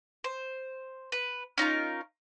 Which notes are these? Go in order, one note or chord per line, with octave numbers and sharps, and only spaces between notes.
C5
B4
C#4 D#4 F4 A#4